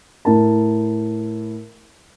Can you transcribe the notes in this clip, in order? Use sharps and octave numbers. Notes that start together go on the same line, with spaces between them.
A2 A#4 A5